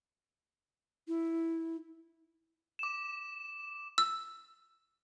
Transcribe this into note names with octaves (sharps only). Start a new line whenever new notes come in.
E4
D6 E7
E6